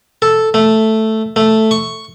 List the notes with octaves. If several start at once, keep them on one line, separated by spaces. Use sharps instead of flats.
A4
A3
A3
C#6